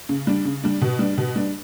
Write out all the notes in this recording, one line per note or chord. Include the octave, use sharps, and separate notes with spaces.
C#3
G3 D4
C#3
G3 D4
B2
G3 D4
B2
G3 D4